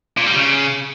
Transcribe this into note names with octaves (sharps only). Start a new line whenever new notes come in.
A#2
G3
C#3